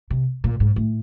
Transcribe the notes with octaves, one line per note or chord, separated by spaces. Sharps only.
C3
A#2
G#2
A2